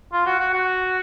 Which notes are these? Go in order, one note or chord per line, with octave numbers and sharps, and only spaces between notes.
F4
F#4
F#4
F#4